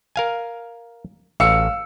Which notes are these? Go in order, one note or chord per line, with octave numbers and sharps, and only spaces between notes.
A#4 F5 G#5
A1 F5 E6 C#7